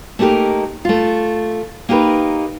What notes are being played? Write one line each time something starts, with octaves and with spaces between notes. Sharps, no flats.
A3 A#3 D#4 G4 A#4
A3 F4
A#3 D#4 G4 A#4 B4